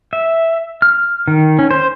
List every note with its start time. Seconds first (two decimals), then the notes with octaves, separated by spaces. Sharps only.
0.13 E5
0.82 F6
1.28 D#3
1.59 C#4
1.71 C5